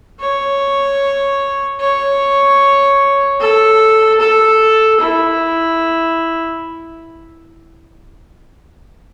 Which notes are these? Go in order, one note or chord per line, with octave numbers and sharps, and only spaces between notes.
C#5
C#5
A4
A4
E4